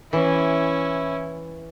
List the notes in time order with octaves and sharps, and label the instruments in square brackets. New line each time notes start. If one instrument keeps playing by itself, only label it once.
[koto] E3 [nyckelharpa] C#4 E4